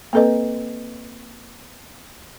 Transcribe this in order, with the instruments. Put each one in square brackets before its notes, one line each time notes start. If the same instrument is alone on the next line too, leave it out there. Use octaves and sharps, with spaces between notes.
[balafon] A#3 C4 A4 B4 D#5